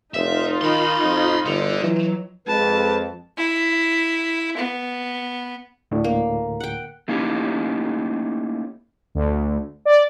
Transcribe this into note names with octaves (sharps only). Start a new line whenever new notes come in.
F1 D#4 F4 E5
D#3 B5 C6
F2
G1 D3
E3 F#3
F2 G#3 B4 A5
E4
B3
D2 A2 D3
A#3
F#5 G5
A3 A#3 C#4 D#4 E4 G4
D2
D5